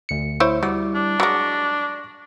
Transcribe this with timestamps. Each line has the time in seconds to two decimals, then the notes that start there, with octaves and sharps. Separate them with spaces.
0.09 D2 C#7
0.40 E4 C5 C#5
0.63 F#3 G3 E4 D6
0.95 D4
1.20 F#3 G#3 C#6 D6 A#6